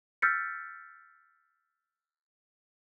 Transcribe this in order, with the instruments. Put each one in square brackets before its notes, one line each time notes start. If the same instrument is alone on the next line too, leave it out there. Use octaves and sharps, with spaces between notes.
[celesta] E6 F6 G6 A6 B6 C#7